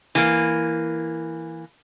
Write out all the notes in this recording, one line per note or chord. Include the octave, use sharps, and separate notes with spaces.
E3 A#3